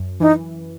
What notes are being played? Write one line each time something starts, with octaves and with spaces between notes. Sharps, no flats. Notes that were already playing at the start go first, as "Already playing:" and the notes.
Already playing: F#2
E3 D#4